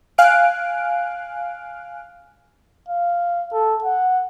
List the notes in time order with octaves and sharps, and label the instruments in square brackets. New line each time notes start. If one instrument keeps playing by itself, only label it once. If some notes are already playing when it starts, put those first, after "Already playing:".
[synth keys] F5 G#5 F6 F#6 D7
[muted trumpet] F5
A4
F#5